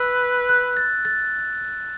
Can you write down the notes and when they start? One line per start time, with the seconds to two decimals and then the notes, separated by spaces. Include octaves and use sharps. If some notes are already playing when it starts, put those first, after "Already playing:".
Already playing: B4 E6
0.49 F#6
0.77 A6
1.05 A6